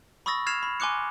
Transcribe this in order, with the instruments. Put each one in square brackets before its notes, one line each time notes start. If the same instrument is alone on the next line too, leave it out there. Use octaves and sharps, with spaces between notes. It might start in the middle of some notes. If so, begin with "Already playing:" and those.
[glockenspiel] B5 C#6 D#6 E6 A6 A#6
F6 G#6 A6 C7 E7 F7
B5
G#5 C6 D6 F#6 C#7